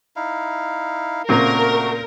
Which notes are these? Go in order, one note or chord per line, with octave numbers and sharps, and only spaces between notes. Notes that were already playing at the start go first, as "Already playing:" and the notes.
D#4 E4 F5
A#2 C#3 A3 C4 F#4 A#4